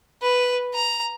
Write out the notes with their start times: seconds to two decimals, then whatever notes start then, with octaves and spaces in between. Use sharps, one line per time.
0.22 B4
0.74 A#5